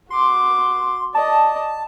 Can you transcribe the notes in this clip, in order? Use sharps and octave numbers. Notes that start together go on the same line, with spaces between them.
F#4 C6 D6
D5 D#5 A5